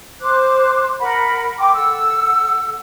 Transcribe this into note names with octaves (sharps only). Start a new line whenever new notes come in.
C5 D6 F#6
A#4 F#5 B5
G5 C6 D6
A4 F#5 E6